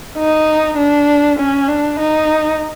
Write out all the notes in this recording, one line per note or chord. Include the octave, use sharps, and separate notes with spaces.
D#4
D4
C#4
D4
D#4